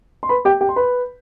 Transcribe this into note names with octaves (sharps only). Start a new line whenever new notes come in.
C6
B4 B5
G4 G5
G4 G5
C6
B4 B5